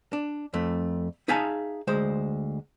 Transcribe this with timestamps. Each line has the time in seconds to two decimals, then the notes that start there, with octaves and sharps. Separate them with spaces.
0.13 D4
0.54 F2 A3
1.28 D#4 G#4 E5 F5 G#5 A5
1.87 D2 G#3 C5